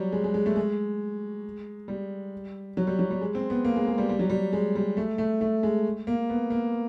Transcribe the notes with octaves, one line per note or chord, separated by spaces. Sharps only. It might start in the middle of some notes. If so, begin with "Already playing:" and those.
Already playing: F#3 G3
G#3
G#3
G#3
A3
G#3
G3
F#3
G3
F#3
G3
G#3
C4
B3
A#3
G#3
G#3
G3
G3
F#3
G3
G#3
G3
A3
A3
A3
G#3
A#3
B3
A#3